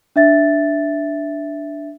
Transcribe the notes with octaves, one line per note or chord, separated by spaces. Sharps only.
D4 E5 A6